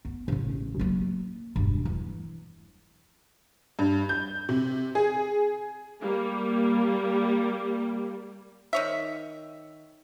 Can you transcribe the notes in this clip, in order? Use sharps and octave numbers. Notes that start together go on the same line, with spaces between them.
B3
A1 C#3
F#3 A#3
E1 G2
E3
G2
G6
C3
G#4
G3 A#3
D#3 C#5 E5